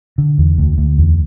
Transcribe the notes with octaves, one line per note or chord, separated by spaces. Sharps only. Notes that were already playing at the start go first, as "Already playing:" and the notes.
D3
E2
D2
D2
E2